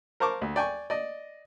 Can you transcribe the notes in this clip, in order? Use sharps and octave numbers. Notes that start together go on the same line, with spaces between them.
A#4 C5 A5 C#6 D6
D2
D5 G5 G#5 C#6
D5 D#5